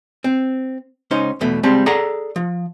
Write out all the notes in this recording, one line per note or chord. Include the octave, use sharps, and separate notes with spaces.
C4
C#2 C#4 D#4 C5
E2 B2 A3
C#3 G3 G#3 C4 A5
G#4 A4 D5 F#5 A#5
F3